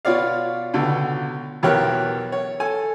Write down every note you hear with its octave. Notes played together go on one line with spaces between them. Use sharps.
B2 F4 C#5 D5 F5
C#2 B2 D3
B1 E2 G4 A#4 C#5 F#6
C#5
A4 G#5